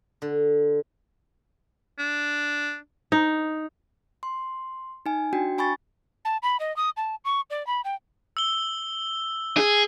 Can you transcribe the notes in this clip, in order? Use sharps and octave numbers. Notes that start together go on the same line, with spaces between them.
D3
D4
D#4
C6
D#4 G#5
D4 F#4 G5
D4 G#5 B5 C#6 A6
A5
B5
D#5
D#6
A5
C#6
D5
B5
G5
E6 G7
G#4